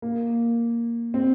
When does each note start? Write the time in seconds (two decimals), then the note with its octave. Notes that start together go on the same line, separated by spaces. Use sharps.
0.02 A#3
1.14 C4